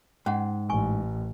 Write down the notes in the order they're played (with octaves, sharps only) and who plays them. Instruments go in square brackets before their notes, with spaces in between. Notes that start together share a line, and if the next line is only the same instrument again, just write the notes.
[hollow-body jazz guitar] G#2 [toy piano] C#4 F#5
[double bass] A1 [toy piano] G#5 C#6